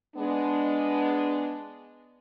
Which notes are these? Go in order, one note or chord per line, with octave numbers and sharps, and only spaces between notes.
G#3 B3 D4